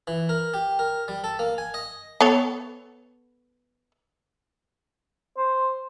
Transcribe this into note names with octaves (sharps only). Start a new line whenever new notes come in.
E3
A#4
G4
A#4
G3
A4
A#3
G#5
D#5
B3 A4 C#5
C5